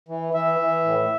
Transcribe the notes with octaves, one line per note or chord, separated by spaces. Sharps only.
E3
E3 E5
E3
A2